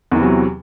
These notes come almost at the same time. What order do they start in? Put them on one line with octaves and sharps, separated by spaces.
E2 E3 C3 F#3